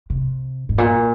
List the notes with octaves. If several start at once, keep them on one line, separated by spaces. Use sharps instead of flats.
C3
G#2
A#2